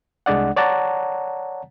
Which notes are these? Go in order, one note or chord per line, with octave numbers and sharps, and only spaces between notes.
C2 G#3 D4 D5 F#5
C#5 D5 F#5 A5 A#5